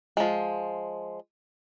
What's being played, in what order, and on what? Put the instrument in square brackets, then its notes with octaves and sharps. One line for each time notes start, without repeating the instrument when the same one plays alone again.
[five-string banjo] F3 G#3